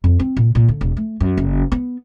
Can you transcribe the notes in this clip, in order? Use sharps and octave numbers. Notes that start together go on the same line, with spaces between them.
F2
C4
A#2
A#2
D3
E1
A3
F#2
F#1
B3